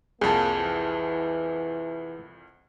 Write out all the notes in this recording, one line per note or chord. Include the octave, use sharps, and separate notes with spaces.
C2 F2 A#3 G#4 A5
E3